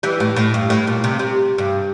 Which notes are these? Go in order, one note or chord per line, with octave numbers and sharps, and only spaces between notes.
E3 G3
A2
A2
G2
A2
A#2
C3
C3
G2